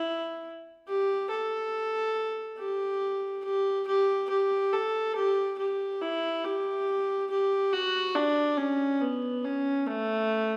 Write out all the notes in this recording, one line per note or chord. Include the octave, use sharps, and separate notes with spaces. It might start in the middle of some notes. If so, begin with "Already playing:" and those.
Already playing: E4
G4
A4
G4
G4
G4
G4
A4
G4
G4
E4
G4
G4
F#4
D4
C#4
B3
C#4
A3